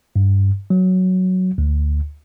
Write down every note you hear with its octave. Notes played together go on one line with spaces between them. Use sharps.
G2
F#3
D2